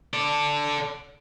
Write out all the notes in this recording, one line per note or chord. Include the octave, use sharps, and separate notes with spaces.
A4 D5